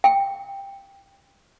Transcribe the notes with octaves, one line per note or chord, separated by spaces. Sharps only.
G5